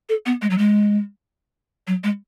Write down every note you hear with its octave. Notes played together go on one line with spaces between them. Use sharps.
A4
B3
G#3
F#3
G#3
F#3
G#3